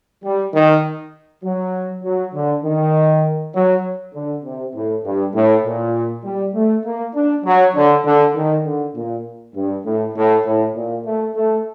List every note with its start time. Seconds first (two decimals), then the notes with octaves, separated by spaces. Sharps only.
0.24 G3
0.54 D#3
1.44 F#3
2.04 F#3
2.35 D3
2.64 D#3
3.55 F#3
4.15 D3
4.45 C3
4.75 A2
5.05 G2
5.35 A2
5.65 A#2
6.25 G3
6.54 A3
6.85 A#3
7.15 D4
7.45 F#3
7.75 D3
8.05 D3
8.35 D#3
8.65 D3
8.96 A#2
9.56 G2
9.86 A2
10.16 A2
10.45 A2
10.76 A#2
11.06 A3
11.36 A3